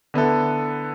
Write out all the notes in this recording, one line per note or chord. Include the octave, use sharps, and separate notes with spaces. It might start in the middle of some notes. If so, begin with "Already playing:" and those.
D3 B3 E4 A4